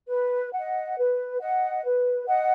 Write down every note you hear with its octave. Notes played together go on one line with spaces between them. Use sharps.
B4
D#5 F#5
B4
D#5 F#5
B4
D#5 F#5